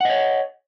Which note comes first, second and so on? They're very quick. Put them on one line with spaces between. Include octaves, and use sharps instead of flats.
F#5 D#5 C#5